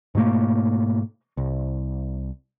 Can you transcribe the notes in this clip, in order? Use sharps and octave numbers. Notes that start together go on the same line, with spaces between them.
G#2 B2 A3 A#3
C2